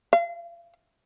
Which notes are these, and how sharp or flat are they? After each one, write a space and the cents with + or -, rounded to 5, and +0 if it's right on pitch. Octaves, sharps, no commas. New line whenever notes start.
F5 -35